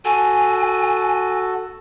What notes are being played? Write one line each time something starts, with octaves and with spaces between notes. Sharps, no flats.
F#4 A4 G#5